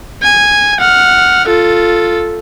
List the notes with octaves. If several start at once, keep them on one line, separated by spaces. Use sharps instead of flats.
G#5
F#5 F6
F4 A4